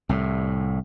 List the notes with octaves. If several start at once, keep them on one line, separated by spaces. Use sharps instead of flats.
C2 A2